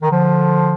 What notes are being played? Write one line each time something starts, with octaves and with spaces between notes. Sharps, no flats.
D#3
D3 F3